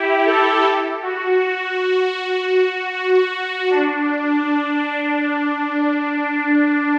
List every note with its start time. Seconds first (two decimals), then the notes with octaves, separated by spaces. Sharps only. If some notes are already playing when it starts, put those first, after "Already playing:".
Already playing: E4 G4
0.26 A4
1.02 F#4
2.93 F#4
3.70 D4